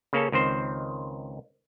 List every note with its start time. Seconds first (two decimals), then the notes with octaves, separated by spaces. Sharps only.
0.13 C#3 A#3 C#4 A4
0.32 C#2 D#3 C4 C5